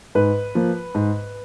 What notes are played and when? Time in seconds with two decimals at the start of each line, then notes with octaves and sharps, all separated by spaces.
0.15 G#2 B4
0.55 F3 A#3
0.95 G#2